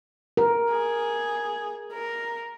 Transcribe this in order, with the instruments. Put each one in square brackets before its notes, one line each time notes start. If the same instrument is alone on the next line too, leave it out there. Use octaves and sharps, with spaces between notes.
[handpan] A#4
[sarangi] G#4
A#4